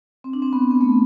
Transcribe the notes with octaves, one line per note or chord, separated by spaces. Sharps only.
C4
D4
C4
B3
B3
A3